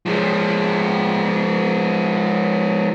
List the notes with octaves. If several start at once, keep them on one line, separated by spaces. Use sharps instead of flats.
F3 G#3